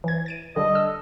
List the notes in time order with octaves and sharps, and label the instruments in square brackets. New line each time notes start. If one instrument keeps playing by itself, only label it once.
[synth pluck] E3 G#6
A6 D7 D#7
[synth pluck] D3 G3 [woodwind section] A4 D#5
[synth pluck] E6